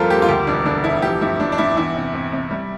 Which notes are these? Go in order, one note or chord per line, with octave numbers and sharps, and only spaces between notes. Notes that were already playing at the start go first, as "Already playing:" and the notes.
Already playing: F2 G3 A#3 F4 A4 A#4 C5
A#3 G4
F4
D2 G4
E1 D4
D3 D4
E1 E4
F3 G4
G2 E4
G2 D4
D4
G2 E4
E2 E4
C3
C3
C3
G3